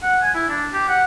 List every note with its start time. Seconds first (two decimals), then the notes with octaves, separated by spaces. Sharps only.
0.03 F#5
0.21 G#5
0.34 E4
0.49 D4
0.73 G4
0.88 F#5